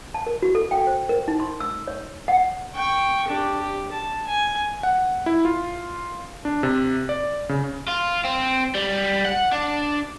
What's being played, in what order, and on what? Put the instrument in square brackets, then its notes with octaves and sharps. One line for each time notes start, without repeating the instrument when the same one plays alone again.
[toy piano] A5
A#4
F#4
A4
G5
C5
A#4
D#4
C6
E6
C#5
F#5
[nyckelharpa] G5 C#6
D4 G4
G4
A5
G#5
[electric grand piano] F#5
E4
F4
D4
C3
D5
C#3
[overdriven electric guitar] F4
C4
G3
F#5
D4